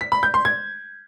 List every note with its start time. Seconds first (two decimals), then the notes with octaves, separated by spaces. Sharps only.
0.01 B6
0.12 B5
0.23 G6
0.34 C6
0.45 G#6